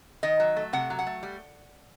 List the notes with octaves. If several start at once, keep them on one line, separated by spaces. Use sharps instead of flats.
D#3 D#5
F#3
A3
C3 F#5
F#3
F#5
A3
G3